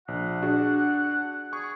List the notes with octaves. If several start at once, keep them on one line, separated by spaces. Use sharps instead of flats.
A#1 F#5
D4 F#4 G#4
G#4 C#6